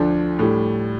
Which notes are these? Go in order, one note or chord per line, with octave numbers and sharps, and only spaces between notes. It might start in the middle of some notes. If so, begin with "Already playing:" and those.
Already playing: D2 D3 F3 D4
A2 G3